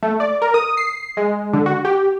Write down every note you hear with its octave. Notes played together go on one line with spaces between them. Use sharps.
A3
D5
A#4
D#6
C7
G#3
D3
F#4
G4